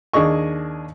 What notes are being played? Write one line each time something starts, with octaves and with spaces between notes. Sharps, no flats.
D#2 D4 G#4 D#5 C#6